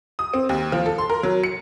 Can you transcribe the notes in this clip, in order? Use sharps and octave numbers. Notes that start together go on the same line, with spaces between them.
D#6
C4
D#2
F3
A4
C6
A#4
F#3
C#7